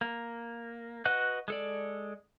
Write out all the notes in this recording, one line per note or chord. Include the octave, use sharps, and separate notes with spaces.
A#3
F#4 B4 D#5 F#5 F#6
G#3 A4 D5